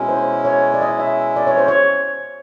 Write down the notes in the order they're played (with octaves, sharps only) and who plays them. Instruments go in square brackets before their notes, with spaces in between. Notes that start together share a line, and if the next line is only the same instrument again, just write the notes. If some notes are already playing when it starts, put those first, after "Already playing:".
Already playing: [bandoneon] B2 G#3 C#4 E4
[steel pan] C5
C#5
D5
D#5
E5
D5
C#5
C5
C#5